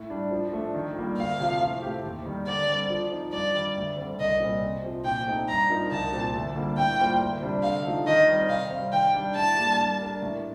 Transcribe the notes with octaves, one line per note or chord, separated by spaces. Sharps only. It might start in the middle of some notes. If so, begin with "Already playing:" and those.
Already playing: A2
G3 D4
F3
A3 D4
D#3
G3 A#3 F4
D2 F5
C3 F3 C4
A2
A3 C4 G4
D#2
D#3 G3
D3 D5
G3 C4
F3
C4 D#4
G2 D5
D#3 G3
D2
D3 G3 C4
C2 D#5
A#2 G3 C4
C3
F3 C4
A#2 G5
A3 C4 D#4 A4
G2 A#5
F3 C4 D#4 A#4
C2 A5
A#2 F3 C4
D2
D3 G3 A#3 F4
A2 G5
G3 A#3 F4 C5
D2
C3 G3 D4 G4
D3 F5
F3 A3 D#4 A4
D#3 D#5
G3 C4
C3 F5
G3 C4
D#3 G5
G3 D4 G4
A2 A5
G3 A#3 D4 G4
G3
D4 G4 A#4 D5
A2